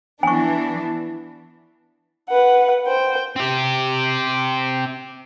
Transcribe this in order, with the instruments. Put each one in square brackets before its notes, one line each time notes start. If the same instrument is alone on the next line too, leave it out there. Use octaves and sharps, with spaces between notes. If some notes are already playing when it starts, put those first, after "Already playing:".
[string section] E3 B3 D4 [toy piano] G#5 C#6
[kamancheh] B4 F#5
C5 G5
[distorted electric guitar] C4 G4